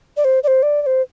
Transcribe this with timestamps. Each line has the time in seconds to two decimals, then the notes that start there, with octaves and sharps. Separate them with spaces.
0.17 D5
0.25 C5
0.44 D5
0.47 C5
0.63 D5
0.82 D5
0.86 C5